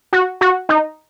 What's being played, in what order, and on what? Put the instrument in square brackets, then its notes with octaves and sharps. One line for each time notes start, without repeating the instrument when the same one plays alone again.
[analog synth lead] F#4
F#4
D#4